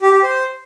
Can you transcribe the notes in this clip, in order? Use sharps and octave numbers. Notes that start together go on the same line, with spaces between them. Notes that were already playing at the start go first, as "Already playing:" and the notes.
G4
G4
C5